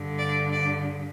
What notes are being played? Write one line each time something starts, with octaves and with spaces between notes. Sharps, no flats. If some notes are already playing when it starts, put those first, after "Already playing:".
Already playing: G2 D3
D5
D5